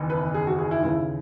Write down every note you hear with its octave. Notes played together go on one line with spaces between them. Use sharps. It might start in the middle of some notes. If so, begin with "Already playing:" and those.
Already playing: F#1 E2 D#3
B4
G#4
F#4
G#4
E4
D#2 C#3 E3 E4